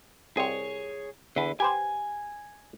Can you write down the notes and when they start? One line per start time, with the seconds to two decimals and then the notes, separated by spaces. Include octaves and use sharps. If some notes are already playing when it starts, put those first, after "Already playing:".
0.37 C2 C4 G#4 C#5
1.36 E2 D3 B4
1.60 G4 B4 C5 G#5